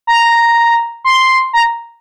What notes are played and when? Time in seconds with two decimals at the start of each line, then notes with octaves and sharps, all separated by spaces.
0.07 A#5
1.04 C6
1.53 A#5